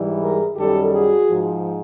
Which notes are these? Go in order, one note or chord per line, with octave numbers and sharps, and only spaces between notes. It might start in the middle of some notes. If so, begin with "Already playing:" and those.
Already playing: G#2 E3 G3
G#4 A#4
F#2 D#3 G3 G4 A4
F#4 G#4
G#2 F3